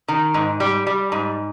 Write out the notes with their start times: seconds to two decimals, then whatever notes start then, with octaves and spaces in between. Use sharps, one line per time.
0.08 D#3
0.34 G#2
0.60 G3
0.87 G3
1.12 G#2